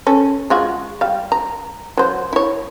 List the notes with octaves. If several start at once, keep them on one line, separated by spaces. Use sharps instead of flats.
C#4 A4
G#3 F4 F#4
G3 F5
A#5
F#3 C5
E4 C#5